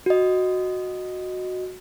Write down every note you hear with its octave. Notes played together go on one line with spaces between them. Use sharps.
F#4 D#5